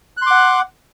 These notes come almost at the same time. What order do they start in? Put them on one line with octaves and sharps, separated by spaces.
F#6 C6 D6 F#5